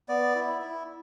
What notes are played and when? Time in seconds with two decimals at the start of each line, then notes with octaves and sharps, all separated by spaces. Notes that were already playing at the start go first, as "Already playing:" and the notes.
0.09 B3 D5
0.35 E4
0.62 E4